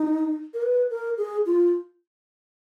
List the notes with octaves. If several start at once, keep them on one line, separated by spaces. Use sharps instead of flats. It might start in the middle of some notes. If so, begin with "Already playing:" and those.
Already playing: D#4
A#4
B4
A#4
G#4
F4